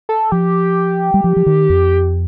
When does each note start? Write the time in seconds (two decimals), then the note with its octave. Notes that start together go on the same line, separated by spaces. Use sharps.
0.09 A4
0.32 F3 G4
1.14 G3
1.24 F3
1.36 F3
1.46 D#3
1.70 F2